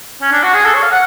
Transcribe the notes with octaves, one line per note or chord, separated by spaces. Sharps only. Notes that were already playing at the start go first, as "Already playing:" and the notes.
C#4
D4
F#4
G#4
A4
C#5
F5
F#5